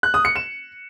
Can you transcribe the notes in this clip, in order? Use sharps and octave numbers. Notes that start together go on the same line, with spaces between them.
F#6
D#6
C#7
E7